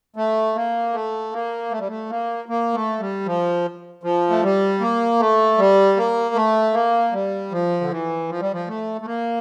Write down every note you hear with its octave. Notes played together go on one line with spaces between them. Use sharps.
A3
A#3
A3
A#3
A3
G3
A3
A#3
A#3
A3
G3
F3
F3
A3
G3
A#3
A3
G3
A#3
A3
A#3
G3
F3
D3
E3
F3
G3
F3
A3
A3
A#3